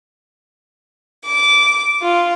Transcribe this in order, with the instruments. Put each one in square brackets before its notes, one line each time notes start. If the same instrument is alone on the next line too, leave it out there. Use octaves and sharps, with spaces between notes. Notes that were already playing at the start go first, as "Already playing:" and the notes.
[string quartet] D6
F4